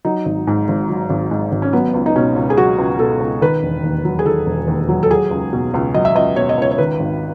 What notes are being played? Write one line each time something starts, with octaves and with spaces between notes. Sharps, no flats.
F#3 D#4
G#1
G#2
G#1
F#3
G#1
G#2
G#1
C#4
F#3 B3
C#2
D#4
B2 C#4
C#2
G#4
F#3 F#4
C#2
B2 A4
C#2
D#3 B4
E1
D#2
F#3
G#4
D#3 A4
E1
D#2
F#3
A4
F#3 G#4
C#2
B2
C#2
F#3 D#5
E5
C#2 D#5
B2 C#5
D#5
C#2 C#5
C#5
D#3 B4
G#1